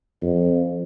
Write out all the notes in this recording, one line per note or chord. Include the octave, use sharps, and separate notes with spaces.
F2